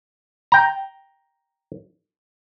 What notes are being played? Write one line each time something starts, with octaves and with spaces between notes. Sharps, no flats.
G5 A#5